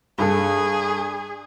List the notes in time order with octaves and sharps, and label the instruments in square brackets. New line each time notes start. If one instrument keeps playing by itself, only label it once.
[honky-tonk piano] G2 A4 [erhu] G#4